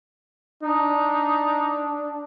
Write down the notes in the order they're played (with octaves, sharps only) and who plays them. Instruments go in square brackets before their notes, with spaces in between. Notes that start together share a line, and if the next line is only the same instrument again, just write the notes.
[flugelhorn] D4 [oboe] D#4